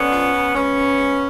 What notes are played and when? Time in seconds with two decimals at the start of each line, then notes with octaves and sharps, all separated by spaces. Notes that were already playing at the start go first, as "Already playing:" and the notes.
Already playing: D3 B3 C#4
0.12 F3
0.34 C#3
0.55 G#3 B3 C#4
0.77 C#3
0.98 G#3